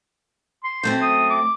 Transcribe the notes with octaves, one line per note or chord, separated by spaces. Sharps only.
C6
F#2 A3 C4 C5
D#6
D6